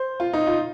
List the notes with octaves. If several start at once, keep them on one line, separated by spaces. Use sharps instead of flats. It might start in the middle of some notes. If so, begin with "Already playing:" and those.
Already playing: C5
F4
D#4
F4